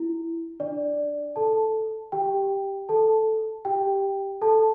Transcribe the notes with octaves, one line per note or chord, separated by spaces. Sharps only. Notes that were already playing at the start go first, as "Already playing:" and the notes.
Already playing: E4
D4 D5
A4 A5
G4 G5
A4 A5
G4 G5
A4 A5